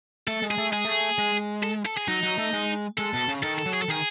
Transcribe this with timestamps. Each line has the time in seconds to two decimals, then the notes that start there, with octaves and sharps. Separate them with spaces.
0.27 A3 A4
0.42 G#3
0.51 G#4
0.58 A3
0.71 G#3 G#4
0.85 A3
1.18 G#3
1.63 A4
1.85 A4
1.97 G#4
2.08 F#3 D#4
2.23 F#3
2.38 A3
2.53 G#3
2.98 G#3 A4
3.13 B2
3.28 C#3
3.43 D#3 A4
3.59 A4
3.66 F#3
3.73 G#4
3.82 A4
3.89 D#3 G#4